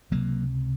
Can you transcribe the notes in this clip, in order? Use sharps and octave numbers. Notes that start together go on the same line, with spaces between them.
C#2 C3 F#3 A#3